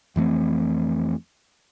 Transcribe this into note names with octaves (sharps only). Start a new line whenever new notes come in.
F2 E3 A3 C4